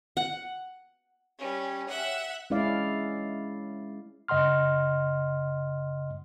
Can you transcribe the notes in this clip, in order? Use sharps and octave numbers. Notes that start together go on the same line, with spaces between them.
F#5
G3 C#4
E5 F#5
G#3 C#4 E4 D5 F5
F#2 C#3 D#5 F#5 C6 F6